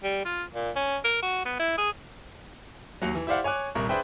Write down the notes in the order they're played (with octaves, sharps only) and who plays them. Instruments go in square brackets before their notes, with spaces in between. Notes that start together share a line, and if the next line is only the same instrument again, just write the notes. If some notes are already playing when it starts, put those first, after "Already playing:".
[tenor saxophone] G3
F4
A#2
C#4
A#4
F#4
B3
E4
G#4
[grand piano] D#2 F#3
E3
E4 G4 C5 D5 F5 F#5
C#5 G#5 D6 F#6
D#1 C2 A#4 C#6
D4 G#4 B4 C5 E5 G5